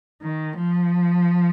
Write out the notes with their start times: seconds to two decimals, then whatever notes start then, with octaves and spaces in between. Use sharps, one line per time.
0.22 D#3
0.56 F3